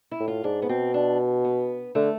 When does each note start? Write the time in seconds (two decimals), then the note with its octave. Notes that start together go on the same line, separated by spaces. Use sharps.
0.11 E4
0.20 A2
0.28 F4
0.44 G#2 D4
0.62 B3
0.69 B2 C4
0.94 D4
1.45 B3
1.95 D3 A3